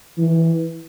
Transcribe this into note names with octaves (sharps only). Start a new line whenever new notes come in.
E3